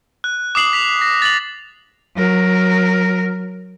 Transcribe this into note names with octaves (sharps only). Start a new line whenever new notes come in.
F#6
D6 D#6 C7 F#7
B6 F7
A#6
A6 F#7
F#3 A#4